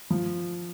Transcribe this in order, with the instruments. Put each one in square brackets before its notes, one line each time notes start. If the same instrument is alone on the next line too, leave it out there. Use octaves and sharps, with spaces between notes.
[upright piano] F3